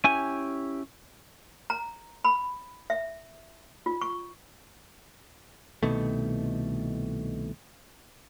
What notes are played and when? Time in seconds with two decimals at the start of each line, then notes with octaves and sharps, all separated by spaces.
0.04 C#4 E4 G4 G#5
1.70 A#5
2.25 B5
2.90 E5
3.86 F4
4.01 C#6
5.83 C2 B2 D#3 A3